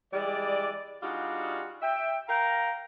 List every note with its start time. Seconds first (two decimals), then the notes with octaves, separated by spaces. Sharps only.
0.13 E3 G3 G#3 D5
1.03 G3 D4 D#4 F4 F#4 G#4
1.82 E5 G5
2.29 A#4 F5 G5 A#5